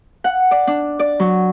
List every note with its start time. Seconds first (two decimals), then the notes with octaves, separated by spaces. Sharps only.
0.24 F#5
0.51 D5
0.67 D4
0.99 D5
1.20 F#3